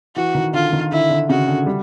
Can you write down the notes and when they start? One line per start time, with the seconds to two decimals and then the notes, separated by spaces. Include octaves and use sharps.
0.16 E3 F#4
0.35 D#3
0.53 D3 F4
0.73 D#3
0.92 D3 E4
1.10 D3
1.29 C#3 F#4
1.48 D3
1.66 G3